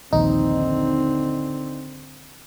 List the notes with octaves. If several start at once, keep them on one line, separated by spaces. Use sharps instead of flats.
A#1 D#2 D3 C4 D#4